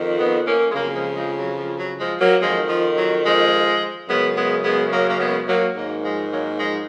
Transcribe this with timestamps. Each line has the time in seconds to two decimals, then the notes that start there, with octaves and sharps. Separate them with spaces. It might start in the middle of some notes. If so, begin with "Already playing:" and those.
Already playing: F2 D#3
0.18 B3 D#4
0.46 A#3 C#4
0.70 G#3
0.74 F2 C#3 F#3 A#3
0.95 F3 G#3
1.16 F3 G#3
1.37 F#3
1.58 F3
1.79 F#3
1.99 F3 G#3
2.21 F#3 A#3
2.41 F2 D#3 F3 G#3
2.69 F3
2.97 F#3
3.25 F3 G#3
4.08 F#2 C#3 G#3 B3
4.37 G#3 B3
4.64 G#3 B3
4.93 F#3 A#3
5.09 A#3
5.20 G#3 B3
5.48 F#3 A#3
5.76 G#2 D#3 F#3 A#3
6.04 F3 G#3
6.32 F#3 A#3
6.60 F3 G#3